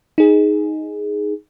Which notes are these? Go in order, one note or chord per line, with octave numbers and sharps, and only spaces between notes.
D#4 G#4